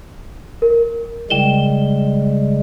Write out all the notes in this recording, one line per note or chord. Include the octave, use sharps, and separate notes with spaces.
A#4
C#3 G3 G#3 G5 E7 G7